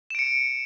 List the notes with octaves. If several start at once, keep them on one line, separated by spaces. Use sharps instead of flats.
C#7 D7 E7